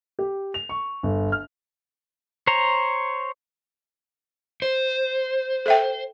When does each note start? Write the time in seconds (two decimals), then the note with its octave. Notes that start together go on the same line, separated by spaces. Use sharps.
0.19 G4
0.54 F7
0.69 C#6
1.03 G1
1.32 F6
2.47 C5 C#5 A#5
4.62 C5
5.66 A4 E5 G5